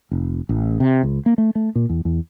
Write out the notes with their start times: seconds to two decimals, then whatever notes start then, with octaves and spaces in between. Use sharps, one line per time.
0.11 F1
0.49 A1
0.80 C3
1.03 C#2
1.26 A#3
1.38 A3
1.55 A3
1.75 A#2
1.89 E2
2.05 E2